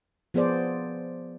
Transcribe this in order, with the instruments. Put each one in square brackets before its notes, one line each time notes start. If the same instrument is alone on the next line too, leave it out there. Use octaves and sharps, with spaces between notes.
[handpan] F3 B3 G#4 C5 D5